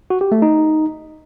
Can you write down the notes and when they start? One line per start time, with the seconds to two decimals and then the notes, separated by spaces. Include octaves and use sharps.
0.10 F#4
0.21 G4
0.32 A3
0.42 D#4